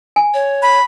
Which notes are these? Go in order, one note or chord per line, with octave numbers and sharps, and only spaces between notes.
G#5
C#5
B5